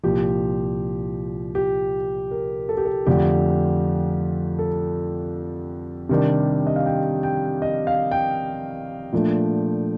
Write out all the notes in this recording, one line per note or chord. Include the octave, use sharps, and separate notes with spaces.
C2 A#2 F3 G4
G4
A#4
A4
G4
A4
F2 D3 A3 G4
A4
C3 D#3 G3 D4
D#5
F5
G5
G5
D#5
F5
G5
A#2 F3 A3 D4